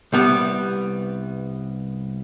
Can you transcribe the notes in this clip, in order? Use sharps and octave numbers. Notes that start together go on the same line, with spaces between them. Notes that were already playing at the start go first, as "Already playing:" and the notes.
C2 G3 B3